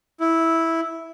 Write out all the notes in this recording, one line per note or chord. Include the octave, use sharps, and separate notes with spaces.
E4